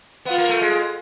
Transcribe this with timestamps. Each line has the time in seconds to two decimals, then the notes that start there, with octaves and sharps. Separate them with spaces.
0.25 B3 F4
0.38 A#3
0.49 A3
0.61 G#3